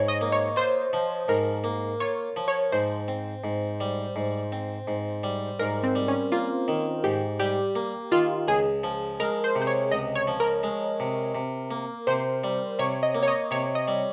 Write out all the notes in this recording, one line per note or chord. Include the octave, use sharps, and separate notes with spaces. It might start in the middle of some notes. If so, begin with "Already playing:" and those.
Already playing: G#2 C#5
D#5
A#3
C#5
F4 C5
F3
G#2 A#4
A#3
F4 C#5
F3
C#5
G#2 C5
C4
G#2
G3
G#2
C4
G#2
G3
G#2 A#4
C4
G3
C#4
A#3 F4
D#3
G#2 G4
G3 G4
A#3
D#3 F4
C#2 G#4
F3
G#3 A#4
C5
C3
C5
C#5
C#2 D#5
C#5
F3
A#4
G#3
C3
C3
A#3
C3 C5
G3
C3 C#5
D#5
A#3
C#5
D#5
C3 C#5
D#5
G3